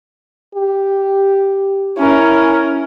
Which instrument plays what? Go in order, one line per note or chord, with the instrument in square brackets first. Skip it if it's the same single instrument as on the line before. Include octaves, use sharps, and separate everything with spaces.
[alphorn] G4
[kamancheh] C#4 A#4 [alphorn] E4